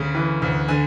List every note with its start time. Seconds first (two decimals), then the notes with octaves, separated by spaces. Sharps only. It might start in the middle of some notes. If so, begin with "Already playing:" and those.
Already playing: D2 C#3
0.15 E3
0.42 D2
0.68 D3 G#5